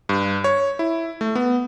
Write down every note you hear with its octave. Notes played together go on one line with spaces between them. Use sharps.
G2
C#5
E4
A3
B3